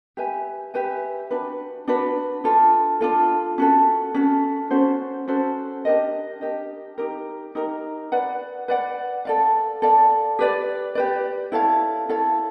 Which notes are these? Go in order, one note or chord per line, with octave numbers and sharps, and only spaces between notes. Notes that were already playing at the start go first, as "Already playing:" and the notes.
G4 B4 E5 G#5
G4 B4 E5 G#5
D4 F#4 B4
D4 F#4 B4
D4 F4 A4
D4 F4 A4
C#4 F#4 A4
C#4 F#4 A4
C#4 F#4 A4 C5
C#4 F#4 A4 C5
D4 G4 A#4 D#5
D4 G4 A#4 D#5
D#4 G4 A#4
D#4 G4 A#4
B4 D5 F#5
B4 D5 F#5
A4 D5 F5
A4 D5 F5
G4 B4 D5
G4 B4 D5
E4 A4 C#5 F5
E4 A4 C#5 F5